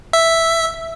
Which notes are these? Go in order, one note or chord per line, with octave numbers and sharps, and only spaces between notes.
E5